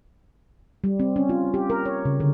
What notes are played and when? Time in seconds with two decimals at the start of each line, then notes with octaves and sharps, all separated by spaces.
0.84 G3
1.00 C4
1.16 C#4
1.29 F4
1.54 G4
1.70 A#4
1.86 C#5
2.05 C#3
2.20 D3